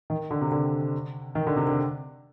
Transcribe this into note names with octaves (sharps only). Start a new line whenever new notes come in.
D#3
D3
C3
D3
D#3
D3
C3
D3